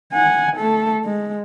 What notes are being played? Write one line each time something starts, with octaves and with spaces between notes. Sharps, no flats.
F#5 G#5
A3 A4
G#3